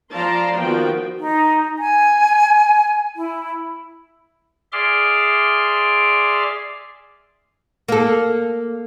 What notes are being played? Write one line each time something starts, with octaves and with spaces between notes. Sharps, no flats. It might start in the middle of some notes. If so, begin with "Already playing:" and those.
F3 D5 F5 A5 A#5 C6
D#3 F3 B3 F#4 G5
D#4
G#5
E4
G#4 D5 E5 C6 D6 F6
A#3 A4